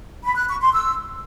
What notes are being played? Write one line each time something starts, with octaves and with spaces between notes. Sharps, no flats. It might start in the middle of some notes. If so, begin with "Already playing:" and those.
B5
F#6
C#6
C6
E6